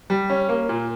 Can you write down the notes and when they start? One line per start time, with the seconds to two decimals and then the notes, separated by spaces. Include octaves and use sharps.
0.10 G3
0.30 C#4
0.49 A#3
0.69 A#2